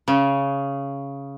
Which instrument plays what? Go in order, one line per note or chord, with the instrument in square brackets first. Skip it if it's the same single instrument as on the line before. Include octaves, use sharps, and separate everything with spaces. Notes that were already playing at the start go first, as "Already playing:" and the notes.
[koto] C#3